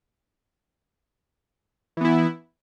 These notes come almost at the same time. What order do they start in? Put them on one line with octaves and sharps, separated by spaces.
E3 B3 E4